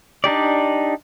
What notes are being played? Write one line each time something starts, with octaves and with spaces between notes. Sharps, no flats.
D4 D#4 G4 D5